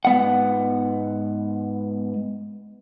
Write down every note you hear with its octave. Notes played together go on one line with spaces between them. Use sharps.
G#2 B3 F#5